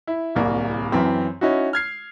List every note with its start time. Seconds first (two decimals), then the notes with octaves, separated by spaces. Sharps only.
0.07 E4
0.35 D1 C2 A#3
0.92 F#2 E3 C4
1.41 C#4 D#4 E4 F#4
1.73 F6 G#6 C7